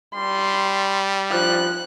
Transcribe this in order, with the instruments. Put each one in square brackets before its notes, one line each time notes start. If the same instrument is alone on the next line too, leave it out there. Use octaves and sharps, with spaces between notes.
[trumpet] G3 [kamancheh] C6
[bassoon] F3 [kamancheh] F#6